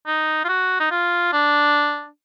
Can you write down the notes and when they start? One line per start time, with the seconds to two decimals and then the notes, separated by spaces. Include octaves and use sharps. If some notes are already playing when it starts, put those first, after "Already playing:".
0.07 D#4
0.44 F4
0.48 F#4
0.80 D#4
0.91 F4
1.33 D4